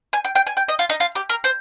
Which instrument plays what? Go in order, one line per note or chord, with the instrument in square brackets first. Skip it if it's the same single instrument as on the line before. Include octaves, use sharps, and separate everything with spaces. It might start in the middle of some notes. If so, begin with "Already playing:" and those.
[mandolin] G#5
G5
G5
G#5
G5
D#5
F4
D#4
F4
G4
A#4
C5